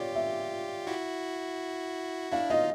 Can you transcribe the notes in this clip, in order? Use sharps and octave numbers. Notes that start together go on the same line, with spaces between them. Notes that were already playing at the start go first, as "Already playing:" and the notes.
Already playing: F4 G4 C#5 D5
E5
E4 F#4
D4 E4 F5
D#4 F4 D#5